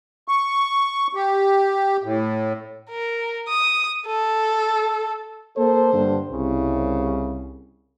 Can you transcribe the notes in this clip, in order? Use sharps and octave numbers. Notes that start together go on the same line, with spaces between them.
C#6
G4
A2
A#4
D#6
A4
A#3 A4 C5
G2 D3
C2 C#3